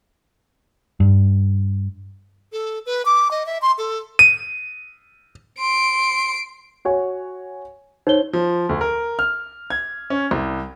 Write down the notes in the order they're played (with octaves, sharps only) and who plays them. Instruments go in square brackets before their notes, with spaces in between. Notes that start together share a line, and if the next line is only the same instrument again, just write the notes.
[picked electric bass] G2
[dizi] A4
B4
D6
D#5
E5
C6
A4
[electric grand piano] D#7
[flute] C6 [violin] C7 D7
[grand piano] F#4 C#5 G#5
[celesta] D#4 C#5 G7 [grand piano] C5
[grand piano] F3
D2
A#4
F6
G#6
C#4
C2